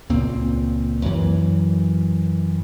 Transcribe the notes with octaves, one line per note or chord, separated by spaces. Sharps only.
C#2 A#2 C4
F#2 E3